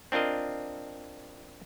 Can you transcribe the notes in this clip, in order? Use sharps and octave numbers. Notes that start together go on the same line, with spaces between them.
C4 D4 F4 A#4 D#5